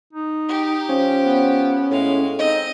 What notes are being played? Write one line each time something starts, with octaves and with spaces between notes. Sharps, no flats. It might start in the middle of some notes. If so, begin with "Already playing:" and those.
D#4
G4
F3 C#4
B3
A2 G#3 F5
C4 D#4 D#5